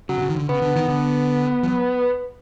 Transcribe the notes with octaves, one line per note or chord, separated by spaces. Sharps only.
C#3 F#3
C3
C#3
D#3
D3
C#3 B3
D3
D#3
D3
F3
F#3